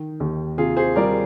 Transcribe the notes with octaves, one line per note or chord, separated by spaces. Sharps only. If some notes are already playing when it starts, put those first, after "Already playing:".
Already playing: D#3
D#2
C3 F4 G#4
G#4 C5
G3 A#4 D5